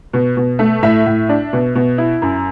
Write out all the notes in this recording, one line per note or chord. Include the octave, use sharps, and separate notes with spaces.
B2
B2
A3
A2 E5
A2
D4
B2
B2
E4
F#2